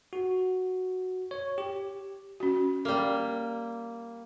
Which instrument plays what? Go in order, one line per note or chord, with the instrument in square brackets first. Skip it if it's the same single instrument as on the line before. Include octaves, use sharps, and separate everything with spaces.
[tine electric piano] F#4
C#5
G4
[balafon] C#4 F#4
[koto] G3 A#3